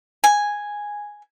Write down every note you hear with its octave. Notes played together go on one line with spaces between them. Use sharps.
G#5